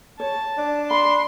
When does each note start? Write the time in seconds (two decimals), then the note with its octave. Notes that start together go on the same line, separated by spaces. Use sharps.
0.20 C#5 A5
0.58 D4
0.91 B5 C6